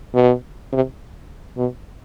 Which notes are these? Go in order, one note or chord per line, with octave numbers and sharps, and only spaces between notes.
B2
C3
B2